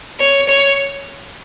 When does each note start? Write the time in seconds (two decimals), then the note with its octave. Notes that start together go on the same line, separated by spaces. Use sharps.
0.20 C#5
0.48 C#5